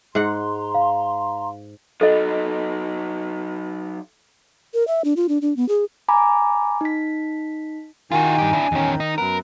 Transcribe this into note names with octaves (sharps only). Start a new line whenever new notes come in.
G#2 F#5 A#5 C6
F5
F#3 D#4 A4 D#5
A#4
E5
D4
F4
D4
D4
B3
G#4
G#5 A#5 B5 D6
D#4 B6
D#3 F4 F#4 G#5
G2 G4
D4 E4
E2 D#3 C#4
D#4
F#2 B3 A#4 B4